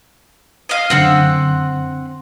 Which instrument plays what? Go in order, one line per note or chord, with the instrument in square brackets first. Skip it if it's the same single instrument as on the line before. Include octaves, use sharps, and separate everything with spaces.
[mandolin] D#5 F5
[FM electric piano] F#2 D3 [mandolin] C4 F#5 E6